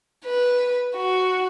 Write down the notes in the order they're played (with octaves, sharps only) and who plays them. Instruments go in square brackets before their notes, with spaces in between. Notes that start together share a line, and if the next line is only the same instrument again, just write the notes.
[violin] B4
F#4